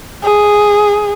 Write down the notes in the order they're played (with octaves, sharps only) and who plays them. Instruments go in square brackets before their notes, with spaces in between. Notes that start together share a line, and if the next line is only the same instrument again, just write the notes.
[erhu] G#4